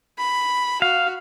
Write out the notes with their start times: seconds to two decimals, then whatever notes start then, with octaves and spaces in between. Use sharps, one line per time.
0.18 B5
0.82 F#4 F5